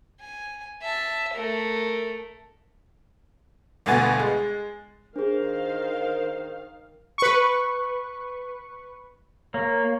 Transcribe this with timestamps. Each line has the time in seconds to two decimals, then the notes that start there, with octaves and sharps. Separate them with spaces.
0.20 G#5
0.82 E5 A5
1.34 A3 A#4
3.86 G1 D2 B2 B3 G#5 A6
4.19 G#3
5.16 D#3 D4 G#4 A#4 C5 F5
7.18 B4 C#6
9.54 A#3 C#5